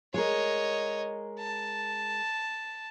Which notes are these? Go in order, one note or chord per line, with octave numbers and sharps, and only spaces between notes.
G#3 A#4 C#5 D#5
A5